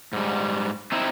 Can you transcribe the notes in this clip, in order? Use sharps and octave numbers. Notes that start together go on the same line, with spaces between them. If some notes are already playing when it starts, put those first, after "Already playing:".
G#2 G3
C4 D#4 E4